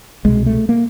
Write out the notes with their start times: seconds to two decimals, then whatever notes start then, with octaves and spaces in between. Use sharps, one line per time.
0.25 C2 B2 G#3
0.46 A3
0.69 A#3